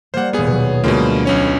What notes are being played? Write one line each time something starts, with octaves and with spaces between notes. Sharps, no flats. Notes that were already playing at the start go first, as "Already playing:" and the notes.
G3 A#3 C5 F#5
D#1 B3 G#4 C#7
B2 F#3
D2 B2 G#3 A#3 F4 B5
B1 C#4 C#5